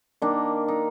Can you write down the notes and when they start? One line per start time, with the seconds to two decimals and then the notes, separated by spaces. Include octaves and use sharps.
0.22 D#3 A#3 D4
0.68 D#4